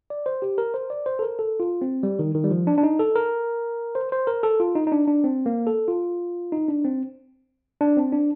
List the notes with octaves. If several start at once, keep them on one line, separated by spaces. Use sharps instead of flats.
D5
C5
G4
A#4
C5
D5
C5
A4
A#4
A4
F4
C4
G3
D#3
D#3
G3
F3
D4
D4
D#4
A4
A#4
C5
C5
A#4
A4
F4
D#4
D#4
D4
D4
C4
A#3
A4
F4
D#4
D4
C4
D4
C4
D4